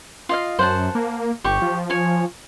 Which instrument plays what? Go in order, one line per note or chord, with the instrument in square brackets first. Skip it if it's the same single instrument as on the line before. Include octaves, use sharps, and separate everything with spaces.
[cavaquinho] F4 D#5 F5
[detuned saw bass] F#2 [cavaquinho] C5 F#5 A5
[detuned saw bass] A#3
[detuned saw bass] G1 [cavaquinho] G4 C#6
[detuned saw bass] F3
[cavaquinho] C#5 G#5